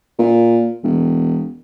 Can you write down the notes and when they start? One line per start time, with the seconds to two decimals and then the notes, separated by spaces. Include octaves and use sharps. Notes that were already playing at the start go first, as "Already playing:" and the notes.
0.19 A#2
0.83 E1